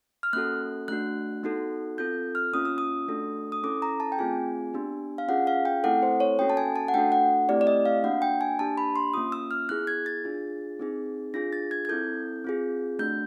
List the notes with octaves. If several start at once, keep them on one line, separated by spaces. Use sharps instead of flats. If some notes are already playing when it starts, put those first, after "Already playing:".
F6
A#3 C#4 F#4 A4 F#6
A3 D4 F#4 F#6
B3 D#4 F#4 A4
C4 F4 A4 G6
F6
A#3 C#4 F4 D#6
E6
D#6
A3 D4 F#4 A4
D#6
C#4 E4 A4 D6
A#5
A5
G5
A3 C4 F4 G#4 G#5
B3 D4 G4
F5
C#4 F4 G#4 F#5
F5
G5
A3 C4 E4 A4 F#5
C5
C#5
A#3 C#4 F#4 A4 G5
A5
G#5
A5
F#5
A3 D4 F#4 A4 G5
F#5
A3 C4 E4 G4 D5
D5
D#5
F5
A#3 D4 F#4 F#5
G5
G#5
A#3 D4 G4 A5
B5
C6
A#3 C#4 F4 D#6
E6
F6
B3 E4 G#4 F#6
G#6
A6
D4 F4 G#4
C4 D#4 G#4
D4 F4 G#4 A#6
A6
G#6
G#6
C4 E4 A4 G6
C4 F4 G#4
A3 D4 F#4 G6